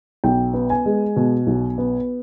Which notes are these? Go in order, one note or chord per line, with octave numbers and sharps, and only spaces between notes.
B1 G5
B3
G#5
G#3
B2
B1
B3